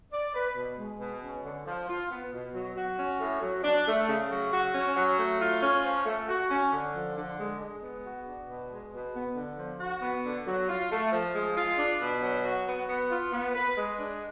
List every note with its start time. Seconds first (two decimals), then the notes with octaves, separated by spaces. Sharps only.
0.12 D5
0.34 B4
0.55 B2
0.77 G#3
0.99 B2
1.21 C#4
1.44 D3
1.67 F3
1.88 F4
2.10 B3
2.31 B2
2.54 F#3
2.76 F#4
2.98 C#4
3.20 A2
3.42 F#3
3.64 D4
3.86 A3
4.08 C#3
4.31 F#3
4.53 F#4
4.74 C#4
4.96 F#3
5.18 A3
5.41 F4
5.62 C#4
5.85 F3
6.06 A3
6.29 F#4
6.50 C#4
6.72 D3
6.94 F3
7.16 D3
7.38 G#3
7.60 G#3
7.82 B3
8.05 F#4
8.26 D4
8.48 B2
8.70 G#3
8.93 B2
9.15 B3
9.36 D3
9.58 F3
9.80 F#4
10.02 B3
10.25 D3
10.47 F#3
10.69 F4
10.91 A3
11.12 F3
11.34 G#3
11.57 F4
11.78 D4
12.01 B2
12.22 F#3
12.44 F#4
12.67 B3
12.89 B3
13.10 F4
13.33 B3
13.54 B4
13.76 G#3
13.99 D4